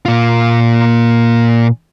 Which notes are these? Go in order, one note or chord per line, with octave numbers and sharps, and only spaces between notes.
A#2 F4